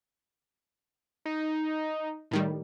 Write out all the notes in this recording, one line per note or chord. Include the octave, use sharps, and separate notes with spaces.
D#4
A2 D#3 G3